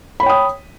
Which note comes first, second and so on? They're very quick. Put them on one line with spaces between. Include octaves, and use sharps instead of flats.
B5 C#5 G5 D#6